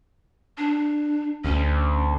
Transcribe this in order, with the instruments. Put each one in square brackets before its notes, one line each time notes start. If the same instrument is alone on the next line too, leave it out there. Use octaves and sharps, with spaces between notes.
[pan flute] D4
[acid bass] D2 [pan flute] C#4